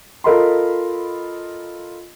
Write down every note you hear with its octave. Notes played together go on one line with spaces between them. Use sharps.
F4 A4 A#4 D#5 B5 C6